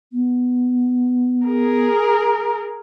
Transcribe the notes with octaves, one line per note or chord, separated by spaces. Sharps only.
B3
G#4 A#4